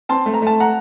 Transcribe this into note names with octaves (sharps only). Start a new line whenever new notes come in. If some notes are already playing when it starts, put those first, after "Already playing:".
C4 A5 C6
A3
A#5
A3
A5
F#5 A#5